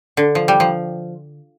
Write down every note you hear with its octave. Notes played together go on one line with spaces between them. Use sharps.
D3
F3
G3
F3